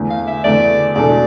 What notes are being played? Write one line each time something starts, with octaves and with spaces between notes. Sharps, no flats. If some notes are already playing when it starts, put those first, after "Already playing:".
Already playing: E2 D3 A3
F5
E5
E2 D3 A3 D5
E2 B2 G#3 D4 A4 D5